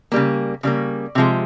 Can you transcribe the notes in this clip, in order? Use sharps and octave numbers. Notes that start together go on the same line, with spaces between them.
C#3 G3 A#3
C#3 G3 A#3
C3 F3 G#3